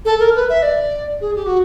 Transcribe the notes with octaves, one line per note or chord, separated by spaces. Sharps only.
A4
A#4
B4
E5
D5
G#4
G4
F#4